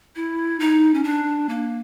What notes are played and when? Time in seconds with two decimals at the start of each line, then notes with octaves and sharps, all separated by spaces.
0.16 E4
0.60 D#4
0.94 C#4
1.04 D4
1.49 A#3